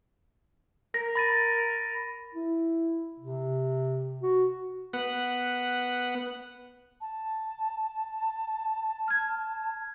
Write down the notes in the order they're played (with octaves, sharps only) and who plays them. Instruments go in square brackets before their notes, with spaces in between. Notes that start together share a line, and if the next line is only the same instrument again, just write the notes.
[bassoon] A#4 [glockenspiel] A#6
[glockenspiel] B5 A6 D#7
[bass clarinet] E4
C3
F#4
[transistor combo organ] B3 F#5
[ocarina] A5
[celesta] F6 G#6